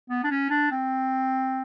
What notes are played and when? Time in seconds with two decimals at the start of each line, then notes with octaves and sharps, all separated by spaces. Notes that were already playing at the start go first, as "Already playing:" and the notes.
0.09 B3
0.24 D4
0.30 C#4
0.50 D4
0.71 C4